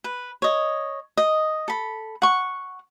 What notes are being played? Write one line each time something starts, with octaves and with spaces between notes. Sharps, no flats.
B4
C#5 D#5
D#5
A4 B5
F#5 C#6